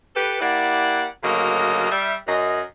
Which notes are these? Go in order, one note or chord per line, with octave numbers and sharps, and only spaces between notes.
G4 A4 B4
A#3 E4 G4 D5 F#5
D2 C#3 F#3 A#3 D#5
G3 E5
F#2 D#5